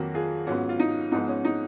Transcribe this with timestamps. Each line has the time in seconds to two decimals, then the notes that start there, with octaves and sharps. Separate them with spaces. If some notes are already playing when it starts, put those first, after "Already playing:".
Already playing: F2 D#3 F#3 A#3 F#4 A#4
0.14 F4 G#4
0.46 G#2 F#3 B3 C#4 F4
0.69 F4
0.80 D#4
1.12 G#2 F3 G#3 B3 D#4
1.28 C#4
1.45 D#4